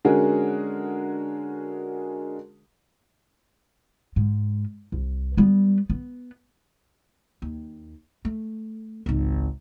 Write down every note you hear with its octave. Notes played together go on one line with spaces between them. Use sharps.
D3 G#3 C#4 F#4 G#4 A#4
G#2
C2
G3 B3
B3
D#2
A3
G#1 C#2